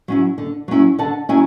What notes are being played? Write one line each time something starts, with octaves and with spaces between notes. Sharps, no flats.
F#3 C#4 E4
D3
F#3 C#4 E4
D3 F#5 A5
F#3 C#4 E4 E5 G#5